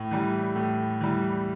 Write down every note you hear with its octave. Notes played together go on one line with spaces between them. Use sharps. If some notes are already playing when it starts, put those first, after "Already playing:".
Already playing: A2
E3 G3
A2
E3 G3